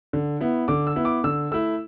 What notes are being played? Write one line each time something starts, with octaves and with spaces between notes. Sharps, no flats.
D3
B3 E4
D3 D6
E6
B3 E4
D6
D3 E6
A3 E4 E6